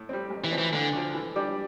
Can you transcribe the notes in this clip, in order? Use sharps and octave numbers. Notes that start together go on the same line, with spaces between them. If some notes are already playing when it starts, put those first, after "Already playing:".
Already playing: A2
G3 C4
A1
E3
A2 F3 C4
E3
D2 D3
D3 F3
E3
G3 D4 G4 D5